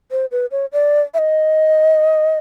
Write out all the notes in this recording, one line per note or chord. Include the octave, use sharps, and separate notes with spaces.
C5
B4
C#5
D5
E5
D#5